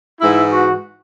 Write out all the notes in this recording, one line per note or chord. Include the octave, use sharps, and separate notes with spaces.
G#2 E3 E4
F#4